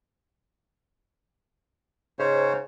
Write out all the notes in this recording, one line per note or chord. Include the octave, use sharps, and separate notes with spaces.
G#2 C#3 C5 C#5